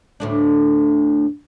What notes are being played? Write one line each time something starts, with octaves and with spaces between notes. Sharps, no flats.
D2 A2 D4